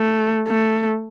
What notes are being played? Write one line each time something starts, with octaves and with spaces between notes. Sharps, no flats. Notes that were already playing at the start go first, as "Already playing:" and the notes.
Already playing: A3
A3